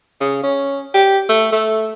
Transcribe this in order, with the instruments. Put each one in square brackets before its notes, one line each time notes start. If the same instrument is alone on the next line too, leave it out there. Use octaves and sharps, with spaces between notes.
[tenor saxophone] C#3
C#4
G4
A3
A3